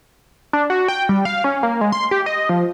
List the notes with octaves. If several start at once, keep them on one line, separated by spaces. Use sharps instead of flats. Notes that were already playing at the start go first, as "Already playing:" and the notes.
D4
F#4
G5
G3
F5
C#4
A#3
G#3
C6
G4
D#5
F3